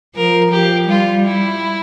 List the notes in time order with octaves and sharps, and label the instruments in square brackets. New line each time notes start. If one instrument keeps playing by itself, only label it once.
[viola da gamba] F3 [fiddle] A#4
[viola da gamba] F3 [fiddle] G4
[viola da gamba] G3 [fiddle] F4
[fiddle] E4